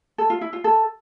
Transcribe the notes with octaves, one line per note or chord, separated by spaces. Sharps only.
A4
F4
E4
F4
A4